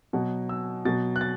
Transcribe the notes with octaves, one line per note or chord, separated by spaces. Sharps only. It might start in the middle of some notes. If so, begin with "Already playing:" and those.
B2 F#3 F#5
E6
B2 F#3 A6
F#6
A6